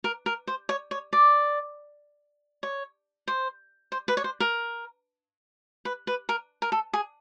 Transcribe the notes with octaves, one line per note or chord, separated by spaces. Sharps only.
A#4
A#4
C5
C#5
C#5
D5
C#5
C5
C5
B4
C#5
C5
A#4
B4
B4
A#4
A#4
A4
G#4